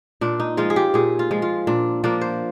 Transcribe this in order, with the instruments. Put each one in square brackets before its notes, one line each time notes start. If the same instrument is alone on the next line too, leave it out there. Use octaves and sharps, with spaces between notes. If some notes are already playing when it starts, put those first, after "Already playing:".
[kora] A#2 D4
D#4
F3 G#3 F4
G#4
G4
A#2 G#4
F4
F3 G#3
F4
A#2 D4
F3 A#3 D4
C5